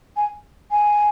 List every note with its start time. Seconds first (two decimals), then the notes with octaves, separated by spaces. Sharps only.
0.16 G#5
0.71 G#5